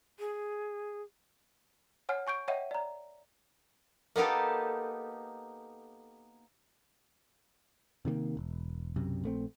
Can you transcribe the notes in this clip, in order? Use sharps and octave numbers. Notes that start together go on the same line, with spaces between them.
G#4
C#5 F#5 G#5 F6
G#5 C#6 G6 D7
C#5 D#5 E5 F#5 G5 D#7
D5 A#5
A#3 B3 D#4 G4 A4
C3 D#3 G3 A#3
E1
B1 F#2 C3
A#1 A3 C4